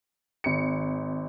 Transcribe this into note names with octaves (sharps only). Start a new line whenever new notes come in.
G#1 C#7